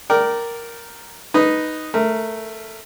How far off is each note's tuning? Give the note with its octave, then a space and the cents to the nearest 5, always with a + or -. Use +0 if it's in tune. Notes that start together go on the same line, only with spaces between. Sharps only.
A#4 +0 D5 +0 G5 -25
D#4 +0 B4 +0
A3 +0 A#4 -15